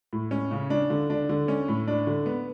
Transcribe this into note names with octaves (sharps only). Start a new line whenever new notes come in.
A2
C#4
C#3
D4
D3
D4
D3
C#4
A2
D4
D3
B3